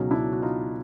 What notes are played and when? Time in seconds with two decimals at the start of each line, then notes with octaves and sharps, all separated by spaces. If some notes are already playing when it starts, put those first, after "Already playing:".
Already playing: C#2 B2 F#3 C#4 D#4
0.11 D4 E4
0.33 F#4
0.42 D#4 F4